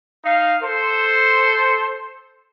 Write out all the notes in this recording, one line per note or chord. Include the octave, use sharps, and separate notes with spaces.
D#4 F5
A4 C5